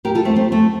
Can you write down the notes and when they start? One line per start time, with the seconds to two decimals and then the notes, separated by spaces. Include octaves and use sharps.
0.04 A2 G4 A#4
0.15 F4 A4
0.25 A3 C4
0.36 A3 C4
0.52 A3